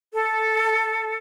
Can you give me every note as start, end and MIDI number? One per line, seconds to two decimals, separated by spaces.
0.13 1.17 69